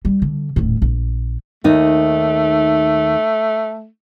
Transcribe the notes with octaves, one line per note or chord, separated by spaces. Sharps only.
G3
D3
D#1 A2
A#1
D#2 A3 D#4